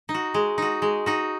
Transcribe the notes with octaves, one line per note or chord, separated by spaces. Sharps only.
D#4
F#4
G#3
D#4 F#4
G#3
D#4 F#4